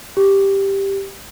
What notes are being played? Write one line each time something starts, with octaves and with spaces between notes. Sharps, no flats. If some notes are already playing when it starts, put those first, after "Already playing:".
G4